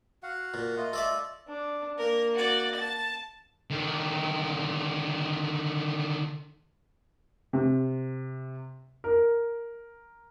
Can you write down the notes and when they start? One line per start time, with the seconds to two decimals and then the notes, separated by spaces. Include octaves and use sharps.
0.23 F#4 F5 F#5
0.54 A#2
0.77 A3 F4 D#5
0.93 A4 D5 E5
1.48 D4
1.98 A#3 A#4
2.34 F#4 D5
2.76 A5 A6
3.70 D3 D#3
7.53 C3
9.04 A#4